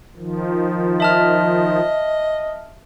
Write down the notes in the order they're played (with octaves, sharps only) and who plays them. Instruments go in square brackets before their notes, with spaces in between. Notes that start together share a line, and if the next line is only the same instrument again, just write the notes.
[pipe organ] D#3 F3
[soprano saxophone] D#5 [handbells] E5 A5 F6